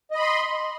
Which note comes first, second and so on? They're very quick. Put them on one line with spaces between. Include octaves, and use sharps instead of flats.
D#5 B5 C6